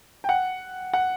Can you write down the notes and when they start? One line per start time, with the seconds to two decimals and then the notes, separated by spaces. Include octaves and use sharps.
0.24 G5
0.29 F#5
0.93 F#5